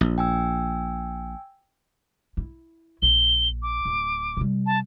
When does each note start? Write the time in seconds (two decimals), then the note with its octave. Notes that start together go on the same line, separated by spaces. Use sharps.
0.01 A#1
0.18 G5 G#5 E6
2.37 E4
3.02 A#1 G7
3.62 D6
3.85 D1
4.37 C3 G3
4.66 A5